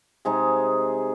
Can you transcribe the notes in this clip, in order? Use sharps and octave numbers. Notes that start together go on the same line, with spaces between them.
C3 G#3 D#4 G#4